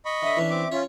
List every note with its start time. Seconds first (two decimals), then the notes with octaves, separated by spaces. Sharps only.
0.06 D#5 B5 C#6
0.22 D3 E5 D#6
0.37 E3 C#4 D4
0.50 C4 D6
0.72 C#4 F4 C#5